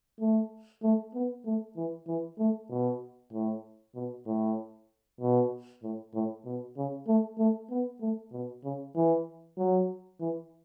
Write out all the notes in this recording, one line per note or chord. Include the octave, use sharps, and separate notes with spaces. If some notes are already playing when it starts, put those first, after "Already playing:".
A3
A3
B3
A3
E3
E3
A3
B2
A2
B2
A2
B2
A2
A2
B2
C#3
A3
A3
B3
A3
B2
C#3
E3
F#3
E3